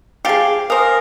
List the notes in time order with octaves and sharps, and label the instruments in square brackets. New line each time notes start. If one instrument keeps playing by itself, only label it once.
[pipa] F3 G4 [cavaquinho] G#4 F5
[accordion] A#4 [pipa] C5 F5 [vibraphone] G#5 [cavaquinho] D#6